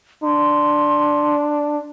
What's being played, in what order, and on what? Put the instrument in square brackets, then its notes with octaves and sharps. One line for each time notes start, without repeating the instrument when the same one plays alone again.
[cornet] D4 [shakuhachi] C6